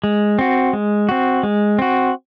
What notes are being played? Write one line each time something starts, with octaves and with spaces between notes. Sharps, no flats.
G#3
C4 F#4
G#3
C4 F#4
G#3
C4 F#4